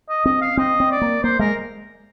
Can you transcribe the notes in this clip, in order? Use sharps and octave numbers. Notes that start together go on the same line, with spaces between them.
D#5
C4 D#5
F5
C4 D#5
C4
D5
A#3
A#3 C5
G#3 A#4